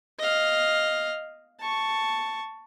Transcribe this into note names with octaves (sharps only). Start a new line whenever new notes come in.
D#5 F5
A5 C#6